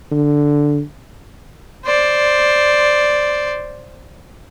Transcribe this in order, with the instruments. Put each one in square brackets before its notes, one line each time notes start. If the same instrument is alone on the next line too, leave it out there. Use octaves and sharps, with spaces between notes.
[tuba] D3
[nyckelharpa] C5 D5